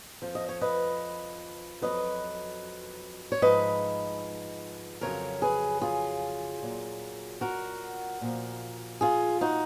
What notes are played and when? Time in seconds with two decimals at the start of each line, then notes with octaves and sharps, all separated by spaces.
0.22 F2 F3
0.35 D#5
0.49 C#5
0.61 B4 D#5
1.81 F2 C#3 F#3 B4 D#5
3.32 C#5
3.42 G#2 F3 B4 D#5
5.01 F2 C#3 F#3 A#4 C#5
5.42 G#4 B4
5.81 F4 G#4
6.62 A#2 F#3
7.41 F#4 A#4
8.21 A#2 F3
9.01 F4 G#4
9.41 D#4 F#4